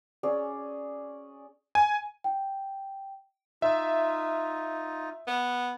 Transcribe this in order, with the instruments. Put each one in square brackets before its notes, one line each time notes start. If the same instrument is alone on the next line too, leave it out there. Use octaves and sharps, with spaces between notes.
[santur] C#4 G#4 D5
[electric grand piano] G#5
[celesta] G5
[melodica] D#4 F4 [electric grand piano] E5
[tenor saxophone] B3